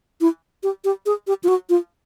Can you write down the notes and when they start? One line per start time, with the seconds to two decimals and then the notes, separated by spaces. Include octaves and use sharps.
0.21 E4
0.63 G4
0.84 G4
1.06 G#4
1.27 G4
1.44 F4
1.48 F#4
1.69 F4